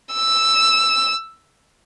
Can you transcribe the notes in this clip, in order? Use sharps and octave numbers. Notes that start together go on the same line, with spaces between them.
E6